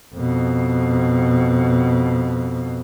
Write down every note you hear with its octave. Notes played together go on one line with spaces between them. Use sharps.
F2 B2